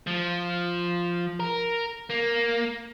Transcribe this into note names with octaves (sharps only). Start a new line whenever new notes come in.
F3
A#4
A#3